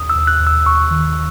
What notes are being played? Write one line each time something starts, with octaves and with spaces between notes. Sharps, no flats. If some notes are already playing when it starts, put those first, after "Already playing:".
Already playing: D#2 D#6
E6
D#2
F#6
D#2
E6
D#2 C#6
D#3